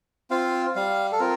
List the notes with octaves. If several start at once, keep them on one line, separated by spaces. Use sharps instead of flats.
C4 F4 F5
G3 F5
A4
C4 F4 A#4